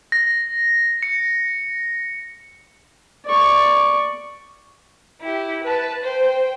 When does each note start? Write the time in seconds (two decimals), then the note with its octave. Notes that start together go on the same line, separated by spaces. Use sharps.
0.12 A#6
1.03 C#7
3.25 D5 C#6
5.21 E4 G4
5.63 B4 A5
6.03 C5 G5